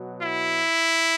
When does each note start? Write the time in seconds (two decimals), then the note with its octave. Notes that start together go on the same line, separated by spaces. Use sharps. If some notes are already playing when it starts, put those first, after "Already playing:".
Already playing: B2 F#3
0.23 E4